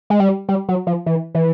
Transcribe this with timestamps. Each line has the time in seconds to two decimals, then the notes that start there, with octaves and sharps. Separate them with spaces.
0.10 G#3
0.20 G3
0.49 G3
0.69 F#3
0.87 F3
1.06 E3
1.35 E3